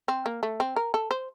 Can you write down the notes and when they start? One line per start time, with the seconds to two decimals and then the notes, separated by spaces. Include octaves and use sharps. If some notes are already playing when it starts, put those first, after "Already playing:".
0.08 C4
0.26 A#3
0.43 A3
0.60 C4
0.76 A#4
0.94 A4
1.11 C5